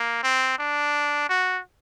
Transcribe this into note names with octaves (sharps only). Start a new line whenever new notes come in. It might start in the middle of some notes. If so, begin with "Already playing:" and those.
Already playing: A#3
C4
D4
F#4